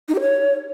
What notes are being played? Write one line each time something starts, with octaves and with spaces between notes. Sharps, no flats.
D#4
G4
C#5